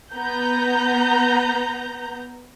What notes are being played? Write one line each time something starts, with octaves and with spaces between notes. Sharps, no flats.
B3 A#5 G6